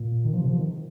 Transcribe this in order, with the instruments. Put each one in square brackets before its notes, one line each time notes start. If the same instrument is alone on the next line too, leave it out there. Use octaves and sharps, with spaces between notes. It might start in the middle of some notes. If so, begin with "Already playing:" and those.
Already playing: [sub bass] A#2
D#3
F3
C3
F3
D#3